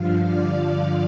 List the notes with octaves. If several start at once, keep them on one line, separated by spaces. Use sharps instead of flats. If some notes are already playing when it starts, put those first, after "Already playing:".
Already playing: G2 D3 F3 F5
D5